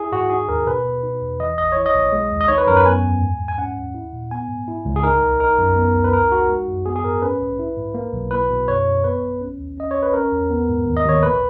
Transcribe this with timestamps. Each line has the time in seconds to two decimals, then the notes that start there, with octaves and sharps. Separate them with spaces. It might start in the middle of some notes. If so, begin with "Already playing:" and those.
Already playing: E4 G#4
0.12 G#2 F#4
0.30 D#4 G#4
0.49 D#2 A#4
0.66 B2 B4
0.85 B2
1.03 D#4
1.21 E2
1.39 E3 D#5
1.57 G#1 D#5
1.72 E4 C#5
1.86 D#5
1.95 B1
2.12 G#3
2.31 D#2
2.41 D#5
2.48 D#4 C#5
2.58 B4
2.67 F#2 A#4
2.77 B4
2.86 B3 G#5
3.04 E2
3.21 G#2
3.40 G#2
3.48 G#5
3.58 C#4 F#5
3.76 D#2
3.94 E4
4.13 A#2
4.31 B3 G#5
4.49 G#2
4.68 E4
4.85 C#2
4.96 G#4
5.03 D#4 A#4
5.22 B1
5.40 D#4 A#4
5.58 F#2
5.76 B3
5.94 C#2
6.04 B4
6.13 D#4 A#4
6.31 A#1 F#4
6.49 G#3
6.67 F#2
6.86 B3 G#4
6.96 G#4
7.04 G#2 A#4
7.22 C#4 B4
7.40 B1
7.59 E4
7.76 G#2
7.94 A#3
8.14 B1
8.31 E4 B4
8.49 B2
8.67 F#2 C#5
8.87 F#2
9.04 B3 B4
9.22 A#1
9.41 C#4
9.58 D#2
9.78 C#4 D#5
9.91 A#1 C#5
10.03 B4
10.13 C#4 A#4
10.32 E2
10.50 B3
10.69 G#2
10.86 D#2
10.97 D#5
11.05 D#2 C#5
11.22 A#1 B4